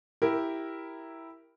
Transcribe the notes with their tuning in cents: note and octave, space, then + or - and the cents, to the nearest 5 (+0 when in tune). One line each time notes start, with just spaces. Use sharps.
E4 +0 G4 +0 A#4 +0